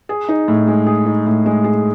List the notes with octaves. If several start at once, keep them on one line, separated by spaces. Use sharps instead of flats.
G#4
D#4
A2
G#3
G#4
D#4
A2
G#3
G#4